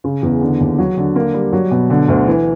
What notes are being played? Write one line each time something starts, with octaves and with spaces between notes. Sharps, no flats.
C#3
E2
D3
D#2
F#3
D3
A#3
G3
F#3
B2
D3
D2
E3